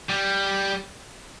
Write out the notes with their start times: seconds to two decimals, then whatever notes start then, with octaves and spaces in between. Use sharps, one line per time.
0.09 G3